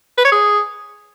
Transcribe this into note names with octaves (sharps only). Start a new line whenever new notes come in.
B4
C#5
G#4